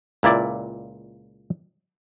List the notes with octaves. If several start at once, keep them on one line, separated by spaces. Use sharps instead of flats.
C#2 A#2 E4 D5